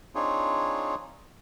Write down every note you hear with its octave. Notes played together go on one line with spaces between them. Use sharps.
C4 D4 D#4 F4 G#4 C#5